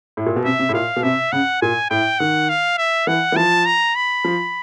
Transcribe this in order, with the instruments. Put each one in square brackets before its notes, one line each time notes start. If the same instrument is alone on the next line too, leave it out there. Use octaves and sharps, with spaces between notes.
[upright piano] A2
A#2
B2
[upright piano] C3 [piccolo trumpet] E5
[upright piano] C3
A2
[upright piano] A#2 [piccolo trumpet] F5
[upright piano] B2
[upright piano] C3 [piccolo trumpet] E5
[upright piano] C#3 [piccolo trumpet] F#5
[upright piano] A#2 [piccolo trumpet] G#5
[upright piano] A2 [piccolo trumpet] G5
[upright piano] D#3 [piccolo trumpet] F#5
[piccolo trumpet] F5
E5
[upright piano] E3 [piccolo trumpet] F#5
[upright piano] E3
[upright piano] F3 [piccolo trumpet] A5
[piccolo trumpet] A#5
B5
[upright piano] F3